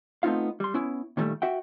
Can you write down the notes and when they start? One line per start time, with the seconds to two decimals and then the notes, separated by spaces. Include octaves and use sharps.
0.23 A3 B3 C4 D#4 F4 F5
0.60 G3 C6
0.74 B3 C#4 E4
1.17 A#2 D#3 E3 G3 A3
1.42 F#4 E5 F#5 G5